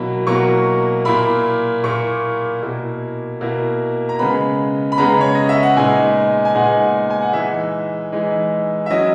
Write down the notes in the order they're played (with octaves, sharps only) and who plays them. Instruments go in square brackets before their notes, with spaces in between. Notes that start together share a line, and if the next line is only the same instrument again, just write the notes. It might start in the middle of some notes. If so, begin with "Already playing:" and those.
Already playing: [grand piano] B2 F#3 A#3 E4 B5
B2 F#3 A#3 E4 C#6
A#2 A#3 E4 B5
A#2 A#3 E4 C#6
B2 A#3 E4
B2 A#3 E4
A#5
C#3 G#3 B3 B5
B5
C#3 G#3 B3 A#5
C#5
D#5
E5
F#5
A#2 G#3 B3 D#4 G#5
G#5
A#2 G#3 B3 D#4 F#5
G#5
F#5
E3 G#3 D#4 E5
E3 G#3 D#4
E5
F#3 C#4 E4 D#5